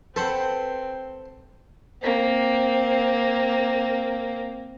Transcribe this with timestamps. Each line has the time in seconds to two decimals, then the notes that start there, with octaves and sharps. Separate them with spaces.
0.16 C4 A4 B4 C5 F#5
2.01 A#3 C4